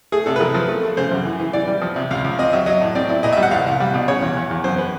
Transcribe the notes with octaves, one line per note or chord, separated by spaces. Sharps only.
A3 G#4
C3 A4
B4
F3 A#4
F3
A3
A3
C#3 C5
F#2
E3
E3
E3 D5
G3
F3
C3
C#2 F5
C#2
C4 D#5
F#3 E5
F#3 D#5
A2
C4 D5
E4
A#2 D#5
G3 E5
F#5
C2 F5
C2
G3
B2
C#3 C#5
E2
E2
E2
F#2 C5
B4